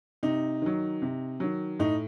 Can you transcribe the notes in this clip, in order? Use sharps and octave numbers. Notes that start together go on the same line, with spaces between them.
C3 D#4
D#3 F#3
C3
D#3 F#3
A2 D#4